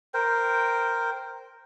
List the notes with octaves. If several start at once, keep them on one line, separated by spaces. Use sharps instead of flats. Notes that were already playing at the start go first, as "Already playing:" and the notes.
A#4 C5 G5